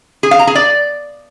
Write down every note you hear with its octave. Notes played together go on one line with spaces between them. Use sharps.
G#4
F5
A#5
G#4
D5